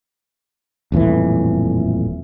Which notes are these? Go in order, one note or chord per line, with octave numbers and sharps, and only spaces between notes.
D#1 F2 A2 E3